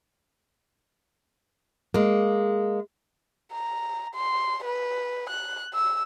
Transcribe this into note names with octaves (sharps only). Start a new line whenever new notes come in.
G#3 A#3
A#5
C6
B4
F#6
E6